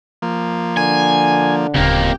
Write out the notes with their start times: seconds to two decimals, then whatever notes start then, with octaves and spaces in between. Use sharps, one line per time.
0.22 F3 A#3
0.77 D3 G#5
1.74 D1 F2 C#3 A#3 G4